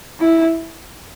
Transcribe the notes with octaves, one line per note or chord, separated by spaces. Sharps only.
E4